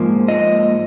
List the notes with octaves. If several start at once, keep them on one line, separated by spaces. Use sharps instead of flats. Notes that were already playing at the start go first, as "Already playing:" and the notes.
Already playing: G#2 F3 A#3
D#5